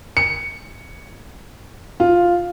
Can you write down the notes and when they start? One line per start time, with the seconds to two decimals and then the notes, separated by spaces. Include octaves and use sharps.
0.17 C#7
2.00 F4